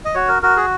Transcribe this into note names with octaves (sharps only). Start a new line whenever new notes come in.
D#5
F#4 C#5
A#4
F#4 A#4
G#4